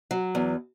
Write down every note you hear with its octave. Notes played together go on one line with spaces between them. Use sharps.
F#3
E2